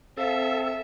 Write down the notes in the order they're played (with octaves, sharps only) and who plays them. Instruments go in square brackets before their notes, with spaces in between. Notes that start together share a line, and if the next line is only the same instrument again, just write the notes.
[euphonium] C4 [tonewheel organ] A4 [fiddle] E5 [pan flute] F5